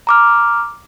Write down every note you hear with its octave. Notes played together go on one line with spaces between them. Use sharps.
A#5 D6 F6